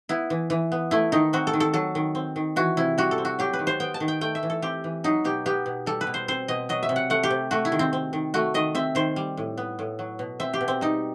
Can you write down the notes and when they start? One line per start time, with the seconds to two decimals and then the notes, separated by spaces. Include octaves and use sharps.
0.09 B3 E4
0.30 E3
0.50 E3
0.72 B3
0.91 A3 E4
1.12 D#3 D#4
1.33 C4 F#4
1.47 A4
1.53 D#3
1.60 A4
1.74 F#3 A4
1.95 D#3
2.15 C4
2.36 D#3
2.56 E3 F#4
2.77 C3 E4
2.98 G3 F#4
3.11 A4
3.18 C4
3.25 F#4
3.39 F#3 G4
3.53 B4
3.59 D#3
3.67 C5
3.80 B3 G5
3.94 A5
4.00 D#3
4.08 G5
4.21 A3 G5
4.35 E5
4.43 E3
4.50 A4
4.62 C4 G4
4.84 E3
5.04 F#3 D#4
5.24 B2 G4
5.46 B3 G4
5.66 B2
5.86 G3 A4
6.01 B4
6.07 B2
6.14 C5
6.28 C4 C5
6.48 B2 D#5
6.69 F#3 D#5
6.83 E5
6.89 C3
6.96 F#5
7.10 A3 F#5
7.23 G4
7.30 C3
7.51 A3 F#4
7.65 E4
7.72 D#3
7.79 C4
7.93 C4
8.13 D#3
8.34 A3 F#4
8.54 D#3 D#5
8.75 C4 E5
8.95 D#3 C5
9.16 G3
9.37 A2
9.58 B3
9.79 A2
9.99 F#3
10.19 B2
10.40 C4 E5
10.53 G4
10.61 B2
10.68 C4
10.81 G3 D#4